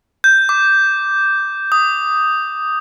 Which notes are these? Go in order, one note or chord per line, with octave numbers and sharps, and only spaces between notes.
G6
D6
D#6